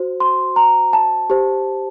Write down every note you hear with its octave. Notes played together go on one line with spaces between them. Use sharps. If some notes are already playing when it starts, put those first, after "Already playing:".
Already playing: F#4 C5
C6
A#5
A5
G4 C5